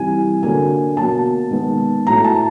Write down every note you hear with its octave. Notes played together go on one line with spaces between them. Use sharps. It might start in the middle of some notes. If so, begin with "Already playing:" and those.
Already playing: C3 E3 G3 G#5
D3 F#3 A#3 G#5
B2 F#3 A#3 A5
D#3 G#3 B3
A2 F#3 A3 A#5
A5